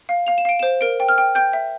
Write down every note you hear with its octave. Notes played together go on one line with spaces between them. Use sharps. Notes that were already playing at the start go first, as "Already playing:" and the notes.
F5
F5 F7
E7
F5 D7
C5 E7
A#4 D7
G5
F6
G5
G5 G6
E5